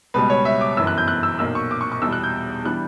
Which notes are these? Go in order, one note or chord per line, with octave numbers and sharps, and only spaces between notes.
C#2 B2 G3 B4
C#5
E5
D6
G1 F#2 E3 B3 E6
F#6
G6
F#6
E6
B1 A#2 A#3 E6
C#6
D6
C#6
C#6
E2 B2 G3 E6
F#6
G6
E3 G3 B3 D4 F#6